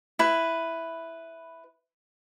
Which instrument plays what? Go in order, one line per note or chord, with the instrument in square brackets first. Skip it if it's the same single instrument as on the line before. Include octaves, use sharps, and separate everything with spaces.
[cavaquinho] E4 B4